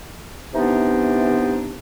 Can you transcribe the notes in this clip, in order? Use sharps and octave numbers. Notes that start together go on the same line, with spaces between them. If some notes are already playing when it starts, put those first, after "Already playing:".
C3 E3 B3 D4 D#4